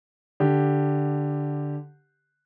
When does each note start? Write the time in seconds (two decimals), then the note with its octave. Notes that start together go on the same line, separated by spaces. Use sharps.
0.40 D3 G4